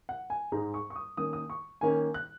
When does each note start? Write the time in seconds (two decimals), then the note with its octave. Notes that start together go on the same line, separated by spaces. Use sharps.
0.09 F#5
0.30 G#5
0.52 G#2 G#3 D#4 A#5
0.74 C#6
0.90 C#6
0.95 D#6
1.17 D#3 A#3 C#4 D#6
1.33 D#6
1.50 C#6
1.81 D#3 A#3 C#4 G#5
2.14 F#6